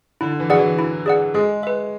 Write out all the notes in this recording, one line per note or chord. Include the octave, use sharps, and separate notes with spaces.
D3 E4
E3
F#3 G#4 D5 F#5
E3
E4
G#4 D5 F#5
G#3 G#4
B4 E5